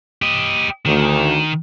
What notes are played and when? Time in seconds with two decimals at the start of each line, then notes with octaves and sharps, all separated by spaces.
0.22 G4 D#5
0.86 D2 D#3